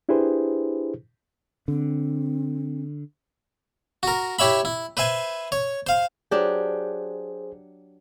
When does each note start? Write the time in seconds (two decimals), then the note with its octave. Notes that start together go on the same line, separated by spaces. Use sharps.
0.09 D4 E4 G4 G#4 B4 C5
1.68 D3 C4
4.03 F#4 A#4
4.39 E4 G4 C#5 E5 B5
4.65 E4
4.97 B4 C5 E5 G#5
5.52 C#5
5.87 C5 F5
6.31 F#3 D4 G4 G#4 C5